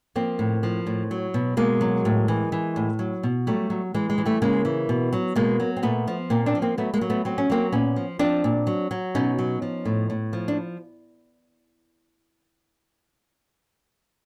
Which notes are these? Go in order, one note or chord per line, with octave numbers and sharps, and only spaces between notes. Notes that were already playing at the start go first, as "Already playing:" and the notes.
F3 A#3 C4
A2
F3
A2
F#3
B2
B2 G#3 A#3
F#3
A2
E3
E3
A2
F#3
B2
F#3 G3 A3
F#3
E3 G#3
G#3
E3
G3 A3
C#3 G#3 A#3
E3
B2
F#3
B2 G#3 A#3
F#3
C4
A#2 A3 B3
F3
A#2 A#3 C4
C4 D4
F3
A#3 C4
F#3 A3 B3
G#3 A#3
F#3
A3 B3
F#3 C4
C#4
F#3 A#3 C4
A#2 B3 C#4
F3
F3 C4 D4
A#2
F#3
F#3
B2 C#4 D#4
F#3
F3
A2
A2
F3
D4